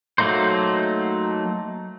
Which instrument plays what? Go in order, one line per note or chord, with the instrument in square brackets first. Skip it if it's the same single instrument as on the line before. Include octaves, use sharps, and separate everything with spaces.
[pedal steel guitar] F#3 A3 A#3 D#4 C5